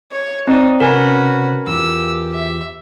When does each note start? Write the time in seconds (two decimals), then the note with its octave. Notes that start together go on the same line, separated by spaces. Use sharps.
0.11 C#5
0.47 C4 D#4 D5 F5 A5
0.80 C3 C#4 F#4 A#4 B4 G#5
1.67 E2 F4 G4 E6
2.33 E5